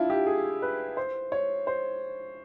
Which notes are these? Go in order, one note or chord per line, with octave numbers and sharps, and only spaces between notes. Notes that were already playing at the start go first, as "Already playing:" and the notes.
Already playing: D4 E4 F4
G4
G#4
B4
C5
C#5
C5